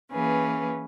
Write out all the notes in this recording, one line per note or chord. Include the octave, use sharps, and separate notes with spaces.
E3 A#3 C#4 G#4 B4